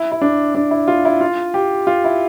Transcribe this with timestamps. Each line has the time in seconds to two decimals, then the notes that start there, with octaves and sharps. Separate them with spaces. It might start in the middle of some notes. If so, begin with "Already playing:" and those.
Already playing: E4
0.12 E4
0.22 D4
0.55 D4
0.71 E4
0.88 F4
1.05 E4
1.21 F4
1.54 G4
1.87 F4
2.04 E4